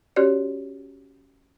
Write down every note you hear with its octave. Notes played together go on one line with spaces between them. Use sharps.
C#4 F#4 G4 C#5 D5